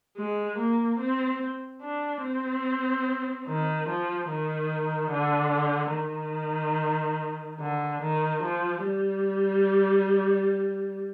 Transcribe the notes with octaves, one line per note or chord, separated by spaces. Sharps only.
G#3
A#3
C4
D4
C4
D#3
F3
D#3
D3
D#3
D3
D#3
F3
G3